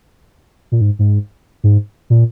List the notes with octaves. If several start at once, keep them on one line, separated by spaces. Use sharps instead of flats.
A#2
G#2
G#2
G#2
A#2